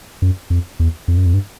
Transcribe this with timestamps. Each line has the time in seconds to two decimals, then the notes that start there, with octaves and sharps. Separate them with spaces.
0.22 F#2
0.50 F2
0.80 E2
1.08 F2
1.17 F#2
1.26 F2
1.34 G2